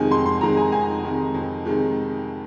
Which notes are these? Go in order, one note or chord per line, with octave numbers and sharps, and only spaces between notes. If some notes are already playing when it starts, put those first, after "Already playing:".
Already playing: F2 C3 D#3 G#3 G#5
F2 C6
C6
C3 D#3 G#3 A#5
G#5
F2 G#5
C3 D#3 G#3
F2
C3 D#3 G#3